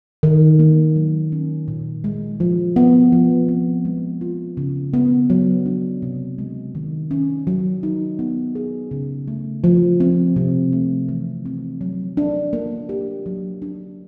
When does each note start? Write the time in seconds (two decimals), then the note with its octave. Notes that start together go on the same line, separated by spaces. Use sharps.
0.23 D#3
0.59 A#3
0.96 F#3
1.32 C#4
1.68 A#2
2.04 G#3
2.40 F3
2.76 B3
3.12 F3
3.49 C4
3.85 G#3
4.21 F4
4.57 C#3
4.94 B3
5.30 F#3
5.66 D4
6.02 C3
6.38 G#3
6.75 D#3
7.11 C#4
7.47 F#3
7.83 D#4
8.19 B3
8.55 G#4
8.91 C#3
9.28 A3
9.64 F3
10.00 C4
10.36 C3
10.73 A3
11.09 E3
11.46 C4
11.81 F#3
12.17 D4
12.53 A#3
12.89 G4
13.26 F#3
13.62 D4